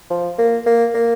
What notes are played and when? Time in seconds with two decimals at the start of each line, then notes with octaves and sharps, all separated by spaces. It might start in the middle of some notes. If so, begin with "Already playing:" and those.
0.10 F3
0.38 A#3
0.66 A#3
0.94 A#3